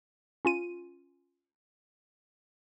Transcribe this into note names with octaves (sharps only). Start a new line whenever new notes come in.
C#4 F4 D#7